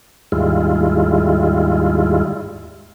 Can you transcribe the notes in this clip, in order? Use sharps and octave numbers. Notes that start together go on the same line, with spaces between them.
D#2 G#2 G3 G#3 E4 F4